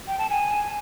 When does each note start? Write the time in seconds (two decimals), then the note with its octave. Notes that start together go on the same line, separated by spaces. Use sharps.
0.08 G5
0.19 A5
0.30 G#5